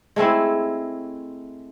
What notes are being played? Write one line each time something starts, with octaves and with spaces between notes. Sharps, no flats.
G#3 A3 C4 E4